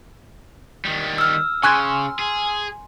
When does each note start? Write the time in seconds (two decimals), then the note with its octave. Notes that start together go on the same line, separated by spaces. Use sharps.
0.85 D#3 G3
1.18 E6 F6
1.63 C#3 G#5 C6 C#6 F#6 G#6
2.19 G#4